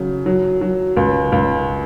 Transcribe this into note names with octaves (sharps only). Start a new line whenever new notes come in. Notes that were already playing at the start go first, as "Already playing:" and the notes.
Already playing: C#3 F#3
F#3
F#3
C#2
C#2